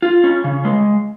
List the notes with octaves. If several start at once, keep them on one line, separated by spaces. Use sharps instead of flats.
F4
C#4
C#3
G#3